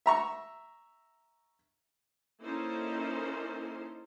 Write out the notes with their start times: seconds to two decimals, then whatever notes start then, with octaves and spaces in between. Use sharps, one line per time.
0.06 E5 A#5 C#6
2.43 A#3 C#4 D#4 E4 A4 C5